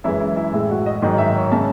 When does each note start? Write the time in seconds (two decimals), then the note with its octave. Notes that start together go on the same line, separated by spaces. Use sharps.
0.04 F#2 E3 G#3 E4
0.20 E4
0.36 E4
0.53 A2 G#3 E4
0.70 F#4
0.86 D#5
1.02 G#2 D#3 F#3 D#5
1.18 E5
1.36 C#5
1.52 C#3 G#3 A5